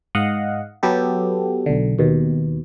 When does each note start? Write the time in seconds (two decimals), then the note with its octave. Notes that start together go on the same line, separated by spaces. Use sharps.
0.15 G#2 D#5 F5 F#5
0.83 F#3 B3 G4 A4
1.66 B1 D3
1.99 D#2 B2